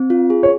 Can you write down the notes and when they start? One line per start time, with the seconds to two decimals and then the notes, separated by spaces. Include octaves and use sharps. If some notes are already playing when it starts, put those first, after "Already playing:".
Already playing: C4
0.10 F4
0.30 G#4
0.43 C#5